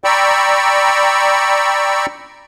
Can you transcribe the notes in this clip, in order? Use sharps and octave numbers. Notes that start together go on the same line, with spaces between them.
D5 G5 A#5 B5 C#6 E6